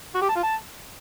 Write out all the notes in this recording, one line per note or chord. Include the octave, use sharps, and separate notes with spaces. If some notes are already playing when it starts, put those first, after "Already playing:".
F#4
G4
A5
F4
A5